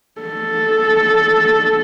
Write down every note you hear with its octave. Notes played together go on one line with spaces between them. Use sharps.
A4